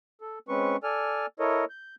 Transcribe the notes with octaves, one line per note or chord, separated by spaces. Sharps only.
A4
G#3 C4 C#4 B4 C#6
A4 D5 G#5 F6
E4 A4 A#4 C#5 D#5
G6